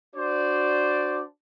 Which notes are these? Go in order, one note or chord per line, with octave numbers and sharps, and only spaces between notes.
D4 F#4 C5 D5